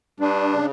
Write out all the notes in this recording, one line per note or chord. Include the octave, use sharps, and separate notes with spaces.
G2 D4
C#3